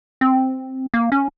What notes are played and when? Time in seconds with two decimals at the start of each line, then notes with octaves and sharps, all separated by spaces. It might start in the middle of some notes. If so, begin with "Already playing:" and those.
0.21 C4
0.94 A#3
1.12 C#4